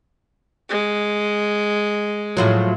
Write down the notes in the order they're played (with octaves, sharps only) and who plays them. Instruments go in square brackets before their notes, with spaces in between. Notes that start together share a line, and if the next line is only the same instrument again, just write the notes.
[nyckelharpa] G#3
[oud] A2 F3 F#3